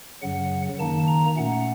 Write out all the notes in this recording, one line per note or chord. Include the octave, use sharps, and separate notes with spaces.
F#2 C#3 F#3 F#5
D#3 A#3 D#4 A5
A#5
A#2 A3 C#4 F#5